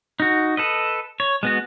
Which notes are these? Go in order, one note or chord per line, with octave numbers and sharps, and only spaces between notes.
D#4 F#4
A4 B4 D#5
C#5
G#3 B3 F#4